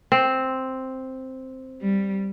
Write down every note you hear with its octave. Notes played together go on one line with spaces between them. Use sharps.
C4
G3